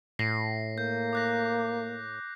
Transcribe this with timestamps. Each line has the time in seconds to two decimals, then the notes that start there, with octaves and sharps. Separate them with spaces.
0.19 A2 A#6 C7
0.78 A#3 G6
1.13 D6 F#6 A#6